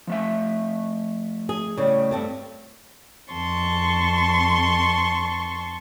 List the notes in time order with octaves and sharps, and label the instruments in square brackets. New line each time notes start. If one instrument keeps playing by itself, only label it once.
[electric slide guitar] F3 A3 E5
[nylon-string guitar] G#4
[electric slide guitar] A2 [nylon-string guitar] C#3 G3
[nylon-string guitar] G2 A3 C4
[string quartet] F2 A5 C6 C#6